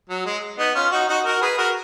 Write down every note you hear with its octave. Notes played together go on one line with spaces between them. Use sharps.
F#3
G#3
B3 D#4
C#4 F4
D#4 F#4
D#4 F#4
F#4 A#4
G#4 B4
F#4 A#4